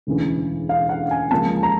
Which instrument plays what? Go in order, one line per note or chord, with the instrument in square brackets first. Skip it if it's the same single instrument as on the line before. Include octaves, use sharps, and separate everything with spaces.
[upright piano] E1 D2 C#3 E3
F5
F#5
G#5
C#2 C#3 F3 A#3 A5
A#5